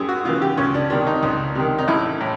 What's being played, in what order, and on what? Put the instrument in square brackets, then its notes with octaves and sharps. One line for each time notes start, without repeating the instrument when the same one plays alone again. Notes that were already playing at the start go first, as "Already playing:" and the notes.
Already playing: [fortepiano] F#2 G4 G#4
F#4
C#3 E3 F4
G4
C#2 C#4
D4
C3 D#3 D4
D#4
C#2
C3 D#3
D#4
A1 E4
A2